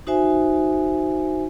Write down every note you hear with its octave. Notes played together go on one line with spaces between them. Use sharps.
D#4 F#4 C5 E5 G#5